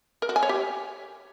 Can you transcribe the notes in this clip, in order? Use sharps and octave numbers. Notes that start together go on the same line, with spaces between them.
A#4
F#4
G#5
C#5
G4